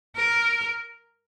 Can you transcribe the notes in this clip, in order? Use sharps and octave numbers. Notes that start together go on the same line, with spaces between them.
A#4